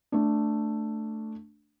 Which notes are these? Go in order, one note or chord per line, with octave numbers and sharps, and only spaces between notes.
A3 D4